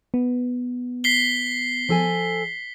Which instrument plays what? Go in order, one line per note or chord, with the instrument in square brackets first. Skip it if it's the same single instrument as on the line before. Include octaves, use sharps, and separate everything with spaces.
[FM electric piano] B3
[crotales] B6 C7 G7
[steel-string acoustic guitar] F3 A4 G#5